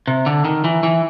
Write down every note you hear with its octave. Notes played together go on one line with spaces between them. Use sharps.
C3
D3
D#3
E3
E3